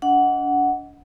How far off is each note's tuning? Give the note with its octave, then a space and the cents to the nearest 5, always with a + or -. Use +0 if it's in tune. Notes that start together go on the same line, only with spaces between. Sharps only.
D4 -35 D#5 +15 F#5 +0